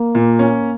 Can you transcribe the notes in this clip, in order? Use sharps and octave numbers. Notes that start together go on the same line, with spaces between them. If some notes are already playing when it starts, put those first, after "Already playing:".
Already playing: A#3
A#2
C#4